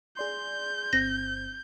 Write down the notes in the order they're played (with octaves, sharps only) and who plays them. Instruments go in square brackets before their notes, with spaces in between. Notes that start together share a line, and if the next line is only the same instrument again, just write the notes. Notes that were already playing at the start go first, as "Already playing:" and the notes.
[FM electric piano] G#4 D5 C6 [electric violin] G6
[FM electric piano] G1 C4 [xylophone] A#6